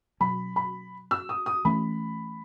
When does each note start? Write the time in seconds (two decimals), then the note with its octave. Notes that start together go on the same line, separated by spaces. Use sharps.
0.20 B2 F#3 C#4 B5
0.56 B5
1.11 E6
1.29 D#6
1.46 D#6
1.65 E3 A3 C#4 B5